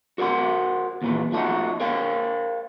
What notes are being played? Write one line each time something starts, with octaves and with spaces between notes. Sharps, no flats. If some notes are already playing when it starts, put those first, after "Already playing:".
F#4 A#4 C5 F#5 C6
D#2 A#2 E3
F3 A3 C#4 D#4 F#4
A#4 C5 F5 G5